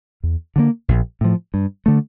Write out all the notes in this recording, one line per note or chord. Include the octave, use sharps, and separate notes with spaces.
E2
D3 F3 A#3
A#1
A2 F3
G2
D3 A3